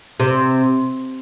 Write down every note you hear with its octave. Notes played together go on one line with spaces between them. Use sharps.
C3